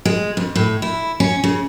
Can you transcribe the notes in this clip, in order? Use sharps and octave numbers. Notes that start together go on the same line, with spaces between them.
G#3
F2
A2
E4
C#4
C#3